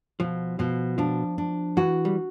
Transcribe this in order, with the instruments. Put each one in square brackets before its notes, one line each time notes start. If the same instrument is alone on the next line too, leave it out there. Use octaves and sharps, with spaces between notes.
[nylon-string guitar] B2 [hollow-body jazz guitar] F3
[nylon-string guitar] B2 [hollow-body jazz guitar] F3
[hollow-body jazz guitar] F3 [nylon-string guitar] D4
[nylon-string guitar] D4
[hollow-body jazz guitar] E3 [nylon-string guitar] F#4
[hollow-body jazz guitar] G3